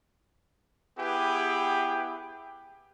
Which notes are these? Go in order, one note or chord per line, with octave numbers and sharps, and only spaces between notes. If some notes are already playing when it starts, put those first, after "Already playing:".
B3 E4 G4 G#4 B4 G5